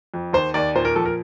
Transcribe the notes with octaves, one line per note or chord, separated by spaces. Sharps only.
F2
D#2 C5
D#2 D5
A#2 C5
A#4
F3 A4
A#4